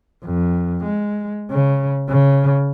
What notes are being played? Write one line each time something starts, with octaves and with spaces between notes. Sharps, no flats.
F2
G#3
C#3
C#3